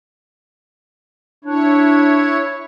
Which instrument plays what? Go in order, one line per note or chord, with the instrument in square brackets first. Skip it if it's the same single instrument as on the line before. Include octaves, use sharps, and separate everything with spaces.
[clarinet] D4 [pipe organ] E4 C#5